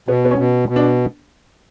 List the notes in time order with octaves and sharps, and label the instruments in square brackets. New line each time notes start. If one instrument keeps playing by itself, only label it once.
[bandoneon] B2 [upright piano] B3
[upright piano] B3
C#4
[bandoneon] B2
B2
[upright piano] D4